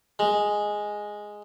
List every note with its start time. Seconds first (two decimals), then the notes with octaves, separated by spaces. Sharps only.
0.19 G#3